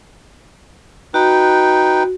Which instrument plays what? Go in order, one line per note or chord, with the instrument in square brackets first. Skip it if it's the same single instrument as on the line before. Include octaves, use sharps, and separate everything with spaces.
[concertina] D#4 B4 G5 [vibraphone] F#4